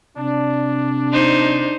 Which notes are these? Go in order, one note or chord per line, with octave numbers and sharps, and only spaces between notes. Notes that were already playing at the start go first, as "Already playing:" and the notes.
C3 D4
D#4 C5